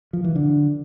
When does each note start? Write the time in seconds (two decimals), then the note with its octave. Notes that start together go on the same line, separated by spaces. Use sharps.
0.13 F3
0.24 E3
0.35 D3